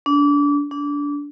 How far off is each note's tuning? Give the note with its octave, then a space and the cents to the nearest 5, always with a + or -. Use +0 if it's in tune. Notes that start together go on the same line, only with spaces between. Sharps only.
D4 -30
D4 -25